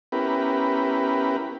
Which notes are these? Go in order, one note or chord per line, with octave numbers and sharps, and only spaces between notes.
B3 C#4 E4 G4 A#4 B4